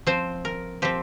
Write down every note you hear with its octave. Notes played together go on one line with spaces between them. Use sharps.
F3 C4 C5
A#4
F3 C4 G4